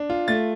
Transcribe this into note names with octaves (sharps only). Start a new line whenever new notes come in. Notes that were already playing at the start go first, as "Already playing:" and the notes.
Already playing: D4
F4
A3 A6